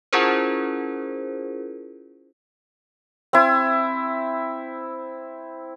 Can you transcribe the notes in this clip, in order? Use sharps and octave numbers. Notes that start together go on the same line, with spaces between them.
C#4 E4 F4 G#4 A#4 C5
C4 E4